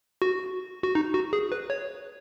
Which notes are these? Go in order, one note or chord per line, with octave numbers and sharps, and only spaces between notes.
F#4
F#4
D#4
F#4
G#4
B4
C#5